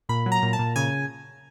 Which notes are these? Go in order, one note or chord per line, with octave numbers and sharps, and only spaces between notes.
A#2 B5
F#3
A#5
A#2
A5
A#2
C#3 G#5